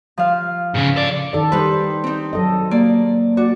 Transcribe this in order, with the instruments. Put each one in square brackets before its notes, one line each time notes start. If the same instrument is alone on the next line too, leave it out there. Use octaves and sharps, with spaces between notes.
[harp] F3 F5
[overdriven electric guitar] G#2 C#3
A4 D5
[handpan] D#3 A4 D5
[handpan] G3 C5 [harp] D#4 B4
[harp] C4 D#4
[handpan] F#3 A4 D#5
[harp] A#3 D5
[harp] F#4 [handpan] D5